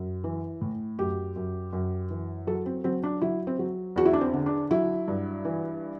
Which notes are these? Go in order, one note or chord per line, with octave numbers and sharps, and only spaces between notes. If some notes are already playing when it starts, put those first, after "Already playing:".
Already playing: F#2
E3
A2
F#2 G4
F#2
F#2
E3
F#3 A4
C4
F#3 C4
D4
F#3 E4
C4
F#3
E2 F#4
E4
D4
C4
D3
D4
F#3 E4
G2
E3